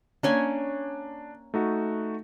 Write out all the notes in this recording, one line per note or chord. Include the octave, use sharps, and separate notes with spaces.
A#3 C#4 D4 G#5
A3 D#4 F#4